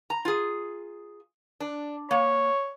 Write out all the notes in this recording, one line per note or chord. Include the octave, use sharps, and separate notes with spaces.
A#5
F4 G#4
D4
A#3 C#5